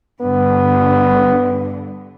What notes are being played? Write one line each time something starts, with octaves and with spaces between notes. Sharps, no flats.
G2 D3 B3